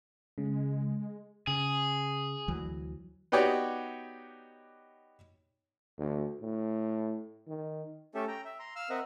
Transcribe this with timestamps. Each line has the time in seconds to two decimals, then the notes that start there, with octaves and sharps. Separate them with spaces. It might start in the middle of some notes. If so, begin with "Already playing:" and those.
0.38 C#3 G#3
1.47 C#3 G#4
2.48 D2 E3 F#3
3.32 B3 D#4 F#4 G4 C#5 D5
5.98 D2
6.41 A2
7.48 D#3
8.15 A3 C#4 G4 A4 E5
8.28 G5 A#5
8.45 E5
8.59 A#5 C6
8.76 F5 E6 F6
8.90 C4 A#4 D#5 E5 F#5